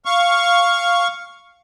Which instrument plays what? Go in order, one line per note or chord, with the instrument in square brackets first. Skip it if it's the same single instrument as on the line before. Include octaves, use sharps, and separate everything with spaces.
[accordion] F5 C#6